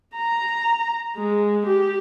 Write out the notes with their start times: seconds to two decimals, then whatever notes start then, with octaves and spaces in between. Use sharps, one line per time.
0.16 A#5
1.17 G#3
1.66 G4